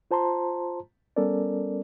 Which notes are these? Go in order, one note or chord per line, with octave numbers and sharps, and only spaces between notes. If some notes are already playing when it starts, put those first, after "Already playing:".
F4 C5 A5 A#5 C6
G3 B3 C#4 A4 A#4 D5